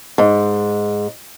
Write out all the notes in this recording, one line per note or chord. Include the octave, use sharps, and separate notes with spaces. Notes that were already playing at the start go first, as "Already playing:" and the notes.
G#2